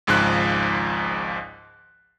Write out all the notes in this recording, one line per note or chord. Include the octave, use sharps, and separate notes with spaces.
G#1 C#2 G#2 F3 F#6